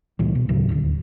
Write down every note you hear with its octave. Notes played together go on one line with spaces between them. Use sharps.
C#2 A#2 E3 G3
B2
D2 A2 C#3 F#3
D#1 D2